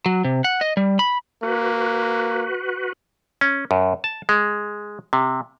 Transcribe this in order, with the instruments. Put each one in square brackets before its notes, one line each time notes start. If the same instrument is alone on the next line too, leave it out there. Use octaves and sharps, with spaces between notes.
[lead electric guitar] F#3
C3
F#5
D#5
G3
B5
[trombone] A#3 [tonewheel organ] F#4 B4
[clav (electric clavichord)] C#4
F#2
A5
G#3
C3